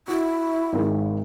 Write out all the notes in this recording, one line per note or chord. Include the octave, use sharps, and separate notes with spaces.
E4 F#4
G#1 D#3 G#3